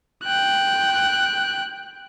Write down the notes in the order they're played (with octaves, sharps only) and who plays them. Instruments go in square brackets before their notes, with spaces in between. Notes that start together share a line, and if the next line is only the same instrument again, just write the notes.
[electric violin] G5 F#6